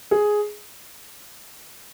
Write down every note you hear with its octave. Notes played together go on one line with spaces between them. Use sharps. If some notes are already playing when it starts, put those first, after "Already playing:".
G#4